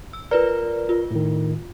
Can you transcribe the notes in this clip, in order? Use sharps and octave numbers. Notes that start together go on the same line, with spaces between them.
E6
F4 A#4 B4 D5
F4
A2 D#3